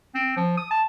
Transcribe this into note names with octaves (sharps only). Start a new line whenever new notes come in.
C4
F3
D#6
A5